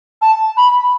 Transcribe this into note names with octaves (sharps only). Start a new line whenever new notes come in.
A5
B5